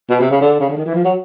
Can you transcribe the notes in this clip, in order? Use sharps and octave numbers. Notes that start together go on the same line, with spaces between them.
B2
C3
C#3
D3
C#3
D3
D#3
E3
F3
F#3